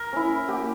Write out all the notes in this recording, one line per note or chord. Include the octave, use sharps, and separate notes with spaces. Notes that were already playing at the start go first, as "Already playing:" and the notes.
Already playing: A#4
C#4 E4
A#3 G4